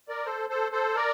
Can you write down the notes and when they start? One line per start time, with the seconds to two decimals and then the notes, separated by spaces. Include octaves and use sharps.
0.08 A#4 D5
0.26 A4 C5
0.49 A4 C5
0.72 A4 C5
0.96 A#4 D5